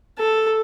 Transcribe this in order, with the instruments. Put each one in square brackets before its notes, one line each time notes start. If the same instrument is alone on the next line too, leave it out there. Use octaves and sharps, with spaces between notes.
[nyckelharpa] A4